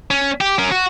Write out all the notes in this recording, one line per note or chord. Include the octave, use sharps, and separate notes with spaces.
C#4
G4
C#4 A#4
F#4